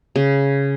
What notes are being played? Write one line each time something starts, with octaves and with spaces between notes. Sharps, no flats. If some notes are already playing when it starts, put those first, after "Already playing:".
C#3